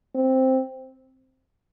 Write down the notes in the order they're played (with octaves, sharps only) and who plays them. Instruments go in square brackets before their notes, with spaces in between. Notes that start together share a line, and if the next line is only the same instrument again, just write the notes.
[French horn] C4